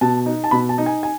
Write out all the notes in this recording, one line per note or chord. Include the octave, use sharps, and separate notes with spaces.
B2 A5
D#4
A5
B2 B5
A5
D#4
G#5
G#5